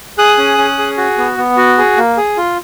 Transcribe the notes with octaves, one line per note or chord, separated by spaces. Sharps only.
G#4 D#6 F#6
C#4
C#4
G#4
F#4
B3
B3
F#4
G#4
A#3
G#4
F4